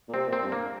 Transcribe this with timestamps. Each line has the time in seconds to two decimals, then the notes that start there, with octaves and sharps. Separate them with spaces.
0.08 A#2
0.14 C3 C4
0.28 A#2 C4
0.42 G2
0.52 A#3